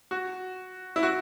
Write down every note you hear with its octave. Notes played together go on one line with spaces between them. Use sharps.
F#4
E4
F#4